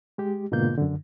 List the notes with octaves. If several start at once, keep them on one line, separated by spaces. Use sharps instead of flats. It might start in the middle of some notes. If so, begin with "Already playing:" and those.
G#3 G4
G#2 B2 D3 A#3 F4 G6
F#2 D3